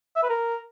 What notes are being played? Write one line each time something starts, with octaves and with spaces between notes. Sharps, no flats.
E5
B4
A#4